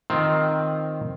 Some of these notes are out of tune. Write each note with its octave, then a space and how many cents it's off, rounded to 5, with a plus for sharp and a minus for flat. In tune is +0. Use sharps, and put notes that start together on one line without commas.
D#3 +0 C4 +0 F4 +0